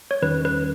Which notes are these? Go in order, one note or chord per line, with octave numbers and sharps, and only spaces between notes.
C#5
E2 D#3 G3 C#4 B4
B4